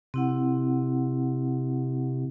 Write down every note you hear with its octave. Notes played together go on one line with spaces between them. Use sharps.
C3 C4 E4 F#5